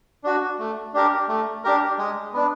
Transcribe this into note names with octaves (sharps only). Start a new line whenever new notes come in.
D4 F#4
A3
D4 G4 A#4
A3
D4 G4 A#4
G#3
B3 D4